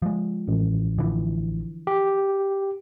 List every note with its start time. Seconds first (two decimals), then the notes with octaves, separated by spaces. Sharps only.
0.02 F3 G#3
0.48 A1
0.98 D3 E3 F3
1.87 G4